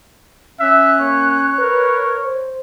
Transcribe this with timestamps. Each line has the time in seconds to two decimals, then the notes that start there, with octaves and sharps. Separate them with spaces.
0.60 C#4 E5 F#6
1.00 A#3 C#5
1.59 A#4 B4
2.24 C5